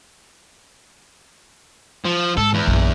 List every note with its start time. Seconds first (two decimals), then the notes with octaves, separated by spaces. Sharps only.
2.05 F3
2.37 G#2 A4
2.54 E2
2.67 A#1 F#2